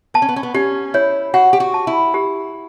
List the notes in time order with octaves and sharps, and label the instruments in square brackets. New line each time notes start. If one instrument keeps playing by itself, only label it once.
[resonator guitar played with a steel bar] B3 [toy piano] A5
[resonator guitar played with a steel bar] C#4
B3
C#4
B3
[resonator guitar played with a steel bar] C#4 [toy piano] G4
[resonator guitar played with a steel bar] E4 [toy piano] C#5
[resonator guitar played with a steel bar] F#4 [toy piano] F#5
[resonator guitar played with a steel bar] G4
F#4
[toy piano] A5
[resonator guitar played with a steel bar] E4
[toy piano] G4